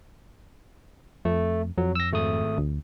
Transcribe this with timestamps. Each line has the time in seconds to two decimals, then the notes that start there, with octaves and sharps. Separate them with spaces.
1.25 F2 A3
1.78 F2 F#3
1.95 E6 A#6
2.12 G#1 A3 D#6
2.58 D2